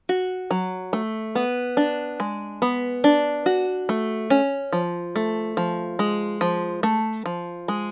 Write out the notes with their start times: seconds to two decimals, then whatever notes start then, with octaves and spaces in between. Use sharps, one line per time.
0.09 F#4
0.51 F#3
0.93 A3
1.35 B3
1.77 D4
2.20 G#3
2.62 B3
3.04 D4
3.46 F#4
3.89 A3
4.30 C#4
4.72 F3
5.16 A3
5.57 F3
5.99 G#3
6.41 F3
6.83 A3
7.26 F3
7.68 G#3